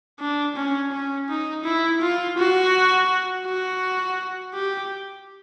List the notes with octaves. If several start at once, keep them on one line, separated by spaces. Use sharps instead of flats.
D4
C#4
C#4
D#4
E4
F4
F#4
F#4
G4